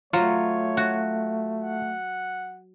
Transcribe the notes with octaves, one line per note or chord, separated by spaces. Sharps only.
F#3 A3 F4 C#5
F#4
F#5